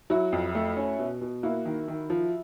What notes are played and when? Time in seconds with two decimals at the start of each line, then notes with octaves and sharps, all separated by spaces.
0.10 F#3 E4 F#4
0.32 F2
0.55 A3
0.77 C#4
0.99 B2
1.21 B2
1.43 A#3 E4 F#4
1.66 D#3
1.88 D#3
2.10 F3